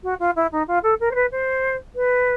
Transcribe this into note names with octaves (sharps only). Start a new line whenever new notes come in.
F#4
F4
E4
D#4
F4
A4
A#4
C5
B4
C5
B4